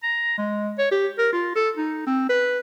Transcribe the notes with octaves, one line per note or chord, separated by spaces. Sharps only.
A#5
G#3
C#5
G4
A#4
F4
A4
D#4
C4
B4